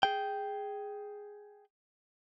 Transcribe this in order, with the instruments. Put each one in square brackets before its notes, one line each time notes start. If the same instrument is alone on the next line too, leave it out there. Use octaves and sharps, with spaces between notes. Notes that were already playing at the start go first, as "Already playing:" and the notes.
[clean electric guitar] G#4 G5